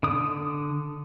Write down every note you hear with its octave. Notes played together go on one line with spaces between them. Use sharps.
D3 D#6